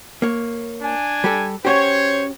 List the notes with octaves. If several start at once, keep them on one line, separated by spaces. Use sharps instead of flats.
A#3 C#5
D4 G#5
G3 G4 A4
C#4 F#4 G4 C5 C#5